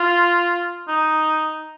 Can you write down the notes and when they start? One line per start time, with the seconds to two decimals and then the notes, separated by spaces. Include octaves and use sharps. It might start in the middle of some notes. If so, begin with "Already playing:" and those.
Already playing: F4
0.88 D#4